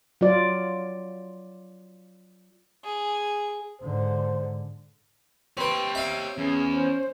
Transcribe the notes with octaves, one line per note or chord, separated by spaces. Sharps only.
F#3 F4 D5
G#4
G#2 D3 C5
C4 G4 B4 C#5
C4 E5 F5
E2 C#4 G#4
C5